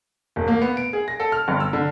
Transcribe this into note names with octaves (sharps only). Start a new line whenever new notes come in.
E1
A#3
B3
D7
G#4
A#6
A4
F6
G1
E6
D3